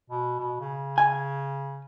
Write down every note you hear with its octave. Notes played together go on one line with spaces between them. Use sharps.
B2
B2
C#3
G#5